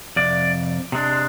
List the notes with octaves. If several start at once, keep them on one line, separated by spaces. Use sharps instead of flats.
F2 C3 D5
C3 G#3 D4